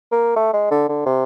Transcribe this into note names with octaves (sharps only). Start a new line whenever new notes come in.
A#3
A3
G#3
D3
D3
C3